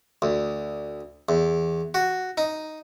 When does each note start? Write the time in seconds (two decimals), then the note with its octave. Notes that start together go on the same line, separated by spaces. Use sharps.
0.22 D2
1.29 E2
1.94 F#4
2.38 D#4